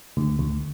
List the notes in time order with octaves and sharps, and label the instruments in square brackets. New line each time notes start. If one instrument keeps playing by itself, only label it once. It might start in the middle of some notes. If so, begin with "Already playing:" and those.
[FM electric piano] D2
D2